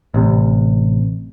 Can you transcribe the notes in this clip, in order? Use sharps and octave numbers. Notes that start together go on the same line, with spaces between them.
A1 C3